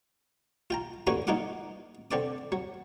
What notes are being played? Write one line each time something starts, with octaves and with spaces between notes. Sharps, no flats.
F4 G5 A#5
A1 D3 A#3 F#4 G#5 C#6
A#2 A#3 D#4 F4 F#5 D6
D3 C4 D5 D6
F#3